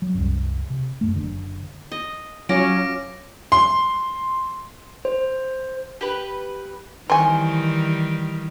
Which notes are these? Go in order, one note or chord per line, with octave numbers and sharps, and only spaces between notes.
F#3
C2 F#2
C3
F#2 A3
F#1 D3
D#5
F#3 C#4 F4 D6 A#6 D7
C6
C5
G4 B4
D#3 E3 G3 C4 G#5 C6 C#6